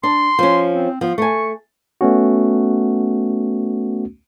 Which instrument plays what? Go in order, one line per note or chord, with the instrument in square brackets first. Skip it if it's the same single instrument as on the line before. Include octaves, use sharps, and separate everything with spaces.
[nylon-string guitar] D4 [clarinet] C6
[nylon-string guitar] F3 C#4
[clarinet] C4
[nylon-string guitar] F3 [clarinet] B3
[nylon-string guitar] A3 G#5 [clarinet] C#6
[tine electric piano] A3 B3 C#4 F#4